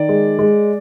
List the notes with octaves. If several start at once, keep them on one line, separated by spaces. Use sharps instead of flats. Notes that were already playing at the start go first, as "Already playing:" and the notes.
Already playing: D#3 D5
G#3
G#3